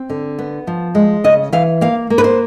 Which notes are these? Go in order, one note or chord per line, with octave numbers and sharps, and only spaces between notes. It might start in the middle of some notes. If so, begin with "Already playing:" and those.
Already playing: C4
D3
B3
F3
G#3
C#3 D#5
E3 F5
A#3 F5
A#3
B4
C5